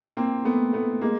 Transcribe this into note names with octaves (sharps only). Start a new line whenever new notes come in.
A#3 C4
A3 B3
A3 B3
G#3 A#3